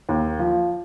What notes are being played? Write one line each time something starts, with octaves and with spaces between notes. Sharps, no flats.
D#2
F3